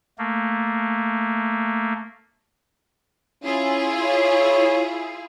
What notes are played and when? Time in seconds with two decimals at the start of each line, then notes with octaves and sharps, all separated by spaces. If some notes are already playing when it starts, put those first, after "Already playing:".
0.18 A3 A#3
3.44 C#4 E4 F4 G#4
4.04 C#5